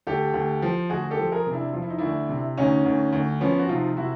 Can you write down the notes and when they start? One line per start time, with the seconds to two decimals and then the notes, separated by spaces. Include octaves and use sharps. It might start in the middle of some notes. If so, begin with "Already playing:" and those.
0.07 D2 G4 A4
0.34 D2
0.62 F3
0.90 D2 F#4 G#4
1.11 G4 A4
1.18 F3
1.32 G#4 A#4
1.47 C3
1.52 D4 E4
1.73 F3 F4
1.82 E4
1.90 D#4
1.99 D2 D4 E4
2.29 C3
2.57 D2 C#4 D#4
2.85 D2
3.13 D2
3.41 F3 B3 C#4
3.59 F#4
3.69 C3 D#4 F4
3.97 C3 E4 F#4